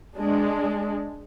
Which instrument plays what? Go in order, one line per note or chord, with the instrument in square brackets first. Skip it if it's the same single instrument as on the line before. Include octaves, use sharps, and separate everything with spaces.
[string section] G#3 D4